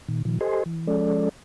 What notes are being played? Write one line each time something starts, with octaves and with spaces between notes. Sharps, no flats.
A#2 D#3
A#2 D#3 F3
G4 A4 C5 D#5 G#5 C6
E3
F3 G#3 C#4 A4 D5